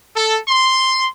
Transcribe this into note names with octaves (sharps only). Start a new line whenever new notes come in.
A4
C6